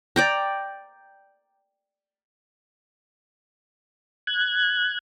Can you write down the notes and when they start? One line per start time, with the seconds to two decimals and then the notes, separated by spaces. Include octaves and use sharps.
0.16 D5 G5 A#5
4.27 F#6 G#6